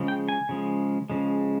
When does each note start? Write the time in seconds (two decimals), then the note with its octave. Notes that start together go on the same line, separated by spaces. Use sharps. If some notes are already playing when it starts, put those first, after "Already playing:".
Already playing: C#3 F3 G#3
0.08 G5
0.29 G#5
0.49 C#3 F3 G#3
1.10 C#3 F3 G#3